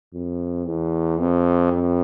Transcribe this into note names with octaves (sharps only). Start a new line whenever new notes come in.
F2
E2
F2
F2